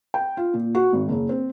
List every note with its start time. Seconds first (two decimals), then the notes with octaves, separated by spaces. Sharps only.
0.14 G5
0.37 F4
0.54 A#2
0.75 F#4
0.93 G#1
1.09 F#1
1.29 C4